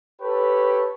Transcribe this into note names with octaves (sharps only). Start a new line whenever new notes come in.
G4 A4 B4 C#5